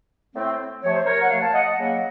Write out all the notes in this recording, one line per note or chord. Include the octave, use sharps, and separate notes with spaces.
A2 A3 C4
C3 F3 A3 C#5
C5
A#4 C#5
F#5
C3 F3 A3 C#5 F5
F5 A5
D#5 F#5
D#5 F#5
C#3 F#3 A#3